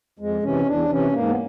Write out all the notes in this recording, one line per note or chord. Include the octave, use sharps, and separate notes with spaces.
F2 G#3
C3 E3 C#4
E2 D4
C3 E3 C#4
G#2 A#3
B3